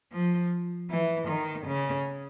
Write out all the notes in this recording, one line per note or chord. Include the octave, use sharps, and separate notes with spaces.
F3
E3
D#3
C#3